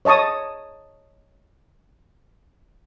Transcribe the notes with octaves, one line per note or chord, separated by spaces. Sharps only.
C#5 D#5 A5 C#6 D#6